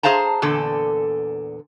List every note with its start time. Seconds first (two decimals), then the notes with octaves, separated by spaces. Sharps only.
0.03 G#4 C5 F5 A5 A#5
0.42 E2 A#2 D3 A4